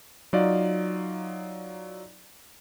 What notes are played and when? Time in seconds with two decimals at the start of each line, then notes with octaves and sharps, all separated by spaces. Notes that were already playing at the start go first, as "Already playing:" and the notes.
0.33 F#3 D#4 F4 D5 D#5 F5